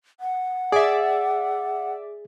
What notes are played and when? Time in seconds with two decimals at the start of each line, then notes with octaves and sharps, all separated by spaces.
0.20 F#5
0.72 G#4 D5 E5